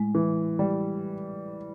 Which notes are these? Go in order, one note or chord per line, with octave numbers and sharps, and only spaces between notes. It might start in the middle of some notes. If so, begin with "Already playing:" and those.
Already playing: A2 G#3
E3
G3